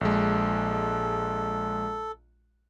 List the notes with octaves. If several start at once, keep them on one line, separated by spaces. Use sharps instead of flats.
A#1 G#3 A4